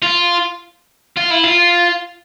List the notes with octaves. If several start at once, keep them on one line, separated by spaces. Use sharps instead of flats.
F4
F4
E4
F4